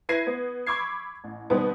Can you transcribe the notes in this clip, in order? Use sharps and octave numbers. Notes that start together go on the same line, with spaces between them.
E4 B4 G#6 A#6 C7 D#7
B3
B5 C#6 D6 E6 G#6 C7
A1
B2 D3 D#3 G3 B3 C4